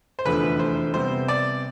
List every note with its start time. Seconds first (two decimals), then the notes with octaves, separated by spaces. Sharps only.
0.19 C5
0.25 F1 E2 D3 F3 A3 B4
0.59 C5
0.94 C3 G3 B3 C5
1.28 D5